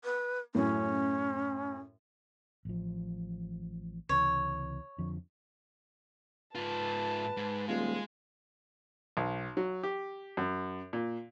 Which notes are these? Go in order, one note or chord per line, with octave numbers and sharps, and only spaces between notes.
B4
F#2 A2 C#4
A1 F3
C#2 C3 E3 C#5
F2 D3 F3
G#2 F4 B4 A5
G#2
D#1 G#3 F4
B1
F#3
G4
F#2
A#2